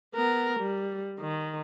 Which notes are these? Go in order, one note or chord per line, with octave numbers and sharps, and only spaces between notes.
B3 A#4
G3
D#3